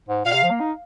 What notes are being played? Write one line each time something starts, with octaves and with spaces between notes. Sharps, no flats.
G#2
A#2 F5
C3
F3
A#3
D#4